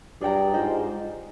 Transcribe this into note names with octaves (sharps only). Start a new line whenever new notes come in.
G2 G#4 D5 G5 A#5
G#2 F4 C5 D#5